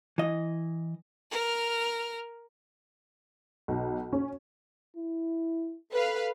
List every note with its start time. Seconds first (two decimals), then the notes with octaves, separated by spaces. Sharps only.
0.18 E3 D#5
1.31 A#4 F6
3.68 B1
4.13 C#4
4.97 E4
5.93 A4 B4 F5